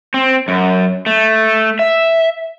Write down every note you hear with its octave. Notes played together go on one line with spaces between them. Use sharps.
C4
F#2
A3
E5